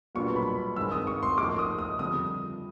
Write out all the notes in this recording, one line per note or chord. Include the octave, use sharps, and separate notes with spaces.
B1 A#2 G3 B3 D4 C#6
B5
G2 D#3 G#3 C4 E6
D#6
C#6
C6
A2 F3 A#3 D#4 D6
D#6
D#6
F2 D3 G3 D#6